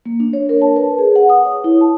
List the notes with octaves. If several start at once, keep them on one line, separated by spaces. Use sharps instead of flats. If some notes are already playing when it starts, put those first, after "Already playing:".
A#3
D4
C#5
A#4
A5
B4
G#4
F#5
D#6
C#5
E4
A5